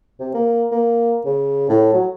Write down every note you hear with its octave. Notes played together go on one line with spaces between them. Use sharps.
C3
A#3
A#3
C#3
A2
F#3